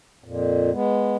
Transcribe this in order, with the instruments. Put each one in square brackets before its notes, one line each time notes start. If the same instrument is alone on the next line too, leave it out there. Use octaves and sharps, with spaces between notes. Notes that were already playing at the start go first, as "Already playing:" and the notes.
[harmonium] F2 A#2
G#3 B3